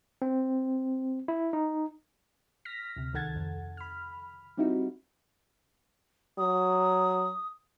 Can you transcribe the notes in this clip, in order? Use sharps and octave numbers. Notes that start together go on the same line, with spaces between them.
C4
E4
D#4
F6 A#6 B6
D2 C3
C#2 D#3 A4 F#5 G#6 A6
F2
B5 F6
G3 C4 D#4 E4 F#4
F#3 D#6